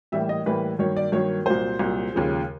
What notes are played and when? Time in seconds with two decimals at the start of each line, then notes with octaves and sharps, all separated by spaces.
0.12 A2 E3 G3 A#3 E5
0.29 D#5
0.46 A2 E3 G3 A#3 B4
0.79 G2 D#3 F#3 A#3 C#5
0.96 D5
1.12 G2 D#3 F#3 A#3 C#5
1.46 C2 A#2 F#3 C5
1.79 C2 A#2 F#3
2.13 D#2 C#3 F3 G#3